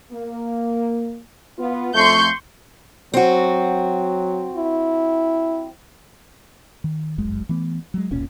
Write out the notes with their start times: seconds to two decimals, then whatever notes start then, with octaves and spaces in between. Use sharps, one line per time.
0.13 A#3
1.59 B3 F4
1.94 F2 A3 C6 C#6 G6
3.14 F#3 C4 F#4
4.55 E4
6.84 D#3
7.18 D1 G1 F#2 G#3
7.49 E3 A3 B3
7.94 F#3 G#3
8.11 E1 C2 A#2 C#4